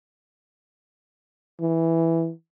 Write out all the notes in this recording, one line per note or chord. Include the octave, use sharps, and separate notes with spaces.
E3